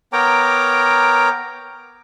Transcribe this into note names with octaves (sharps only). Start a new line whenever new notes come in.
B3 A#4 C#5 G5 A#5 D6